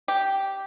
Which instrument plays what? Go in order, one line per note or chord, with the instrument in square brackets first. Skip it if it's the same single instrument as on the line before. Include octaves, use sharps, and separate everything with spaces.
[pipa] G4